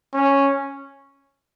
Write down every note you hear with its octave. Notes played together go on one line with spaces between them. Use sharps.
C#4